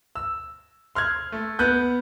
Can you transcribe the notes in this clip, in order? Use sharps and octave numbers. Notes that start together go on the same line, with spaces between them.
E6
C6 F6 F#6 G#6
A3
B3 F#6 G6